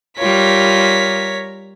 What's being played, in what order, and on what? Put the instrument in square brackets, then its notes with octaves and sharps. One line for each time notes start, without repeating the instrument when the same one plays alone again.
[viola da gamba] G3 F4 [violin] A#4 B6 [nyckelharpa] C#5